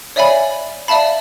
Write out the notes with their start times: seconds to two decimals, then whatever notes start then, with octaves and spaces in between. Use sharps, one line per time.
0.16 C#5 D5 E5 F5 G#5 B5
0.88 D5 E5 F5 A5 B5